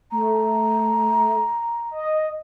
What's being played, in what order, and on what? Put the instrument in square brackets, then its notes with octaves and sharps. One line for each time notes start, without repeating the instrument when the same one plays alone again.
[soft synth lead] A3 [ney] A#5
[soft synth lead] D#5